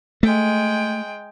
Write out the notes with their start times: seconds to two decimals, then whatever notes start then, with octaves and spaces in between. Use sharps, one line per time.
0.23 G#3 A3 G5